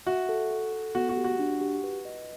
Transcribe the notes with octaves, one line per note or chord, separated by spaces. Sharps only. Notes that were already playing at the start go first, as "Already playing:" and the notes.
F#4 E5
A4
A4
A4
B3 F#4
F#4
G4
F#4
D4
G4
B4
D#5